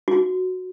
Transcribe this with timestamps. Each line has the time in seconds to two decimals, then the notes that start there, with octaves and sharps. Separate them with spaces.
0.08 F#4